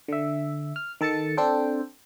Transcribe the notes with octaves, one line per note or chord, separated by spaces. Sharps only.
D3 E5
F6
D#3 A4 A5 A6 C#7
C4 D4 A4 C5 G5